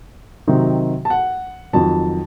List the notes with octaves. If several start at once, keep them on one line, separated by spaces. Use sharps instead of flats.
C3 D#3 F#3 C4 D#4
A5
F#5
F2 D#3 F#3 A5